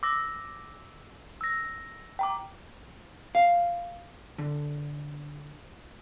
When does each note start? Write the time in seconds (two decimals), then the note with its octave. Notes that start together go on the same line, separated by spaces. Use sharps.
0.03 D6 E6 A#6
1.41 E6 A#6
2.19 G5 A#5 D6
3.35 F5
4.38 D3